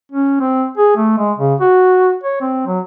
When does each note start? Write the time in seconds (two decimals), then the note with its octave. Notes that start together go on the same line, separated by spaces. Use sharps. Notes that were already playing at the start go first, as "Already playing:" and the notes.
0.12 C#4
0.40 C4
0.77 G#4
0.97 A3
1.18 G#3
1.38 C#3
1.60 F#4
2.24 C#5
2.41 C4
2.67 F#3